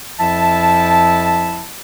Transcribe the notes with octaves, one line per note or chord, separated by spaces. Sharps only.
F2 F3 E4 E5 A5